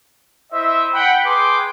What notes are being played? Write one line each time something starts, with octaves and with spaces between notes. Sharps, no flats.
E4 C5 D#5 E5
F#5 G5 B5
G#4 B4 G5 G#5 C6 D6